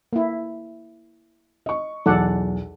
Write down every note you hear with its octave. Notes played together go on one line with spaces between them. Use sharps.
A#3 E4
D#5 C#6
B1 E2 A4 D5 F#5